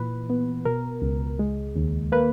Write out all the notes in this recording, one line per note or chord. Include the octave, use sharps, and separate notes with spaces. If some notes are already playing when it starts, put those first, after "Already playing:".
Already playing: A#2 E3 B4
B3
B2 A#4
C#2
G#3
D#2
A#3 B4